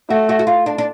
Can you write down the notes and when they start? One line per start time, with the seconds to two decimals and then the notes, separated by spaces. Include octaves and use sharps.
0.10 A3 F#4
0.29 F#4
0.39 F#4
0.47 F4
0.66 D4
0.78 D4